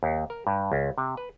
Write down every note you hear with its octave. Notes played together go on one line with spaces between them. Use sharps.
D#2
A#4
G2
C#2
C3
B4